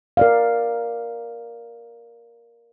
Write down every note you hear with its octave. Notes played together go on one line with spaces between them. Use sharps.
A#4 D5 F5